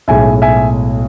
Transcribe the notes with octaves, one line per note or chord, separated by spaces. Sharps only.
B1 A2 G#3 E5 G#5
E5 G#5